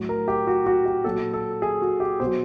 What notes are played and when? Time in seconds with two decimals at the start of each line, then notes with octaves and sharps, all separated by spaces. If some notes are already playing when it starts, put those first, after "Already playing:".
Already playing: A2 F#3
0.09 A#4
0.28 G4
0.47 F#4
0.66 F#4
0.86 G4
1.04 A#2 F#3 A4
1.34 A4
1.62 G#4
1.82 F#4
2.00 G4
2.20 B2 F#3 C5